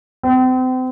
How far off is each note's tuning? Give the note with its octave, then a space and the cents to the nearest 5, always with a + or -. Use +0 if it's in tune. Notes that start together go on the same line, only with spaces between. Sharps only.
C4 -35